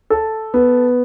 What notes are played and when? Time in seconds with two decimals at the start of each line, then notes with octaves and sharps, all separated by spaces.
0.10 A4
0.54 B3